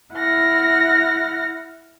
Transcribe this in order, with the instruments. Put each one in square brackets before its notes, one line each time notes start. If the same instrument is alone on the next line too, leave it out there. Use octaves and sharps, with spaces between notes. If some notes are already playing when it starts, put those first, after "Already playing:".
[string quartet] E4 F#5 F6 A#6